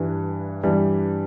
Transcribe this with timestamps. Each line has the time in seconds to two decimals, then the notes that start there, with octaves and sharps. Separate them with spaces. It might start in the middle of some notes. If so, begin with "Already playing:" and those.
Already playing: G2 E3 G3
0.63 G2 E3 G3